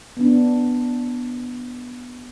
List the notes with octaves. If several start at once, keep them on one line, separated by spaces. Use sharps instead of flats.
B3 D4